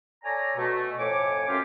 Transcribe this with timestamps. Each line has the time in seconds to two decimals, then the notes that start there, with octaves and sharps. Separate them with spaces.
0.24 A4 C#5 D5 G#5 A#5
0.57 B2 A3
0.98 F2 A2 C#5 G#5 D6
1.48 F#2 C#4 F4 G4